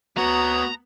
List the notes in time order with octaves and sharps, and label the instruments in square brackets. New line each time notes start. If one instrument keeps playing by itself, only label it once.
[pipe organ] D2 C#5 D#6 [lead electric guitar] B3 [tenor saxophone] F#4 [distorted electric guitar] A#5